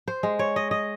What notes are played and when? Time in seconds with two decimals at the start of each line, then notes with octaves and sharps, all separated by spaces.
0.08 C5
0.23 G#3
0.39 C#5
0.56 D#5
0.71 D#5